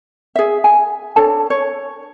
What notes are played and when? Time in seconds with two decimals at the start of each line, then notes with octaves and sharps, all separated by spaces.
0.35 G#4 E5
0.64 G#5
1.16 D4 A4 C#5 A5
1.50 C#5